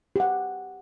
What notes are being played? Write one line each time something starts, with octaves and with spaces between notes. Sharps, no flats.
G4 F#5